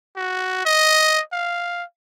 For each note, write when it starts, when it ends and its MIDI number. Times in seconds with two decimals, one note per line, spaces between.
0.17 0.65 66
0.66 1.21 75
1.33 1.84 77